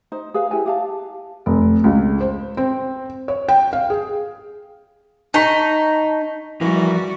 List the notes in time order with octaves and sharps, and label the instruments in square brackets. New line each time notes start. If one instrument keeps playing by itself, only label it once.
[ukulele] D#4 C5
G#4 B4 F5
E4 G4 G#5
G4 F5 A5
[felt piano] F1
C#2
C5
C4
C#5
G5
F5
G#4
[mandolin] D#4 [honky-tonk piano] A5 C#6 B6
[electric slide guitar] E2 F3 A#4 [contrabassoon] E3 [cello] G3 F#4